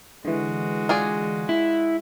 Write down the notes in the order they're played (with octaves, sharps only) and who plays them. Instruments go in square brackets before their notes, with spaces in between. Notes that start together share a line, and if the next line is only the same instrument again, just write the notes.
[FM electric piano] D3 E3 [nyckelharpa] G#3 F#4
[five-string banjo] F4 G#4 D5
[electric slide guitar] E4